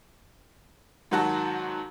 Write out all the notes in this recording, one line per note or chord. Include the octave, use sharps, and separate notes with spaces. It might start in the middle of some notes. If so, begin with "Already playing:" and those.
G#2 D#3 F#3 F#4 A5